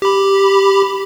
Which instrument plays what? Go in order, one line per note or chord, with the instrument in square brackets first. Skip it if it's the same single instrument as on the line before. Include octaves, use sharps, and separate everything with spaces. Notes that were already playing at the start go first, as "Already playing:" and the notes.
[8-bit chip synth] G4 B5